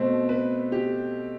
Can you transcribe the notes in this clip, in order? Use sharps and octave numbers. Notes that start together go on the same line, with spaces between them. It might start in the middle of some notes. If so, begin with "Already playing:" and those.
Already playing: B2 A3 C4
B4
G4